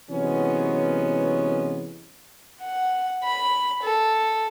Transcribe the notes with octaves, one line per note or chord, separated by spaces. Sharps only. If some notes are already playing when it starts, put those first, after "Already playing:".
C3 E3 F#3 G#3 B3 C#4
F#5
B5
A4